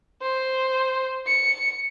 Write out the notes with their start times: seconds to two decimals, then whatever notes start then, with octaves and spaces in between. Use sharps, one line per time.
0.22 C5
1.27 C#7